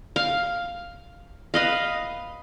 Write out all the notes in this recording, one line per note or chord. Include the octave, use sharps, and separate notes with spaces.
F5
B4 D#5 F5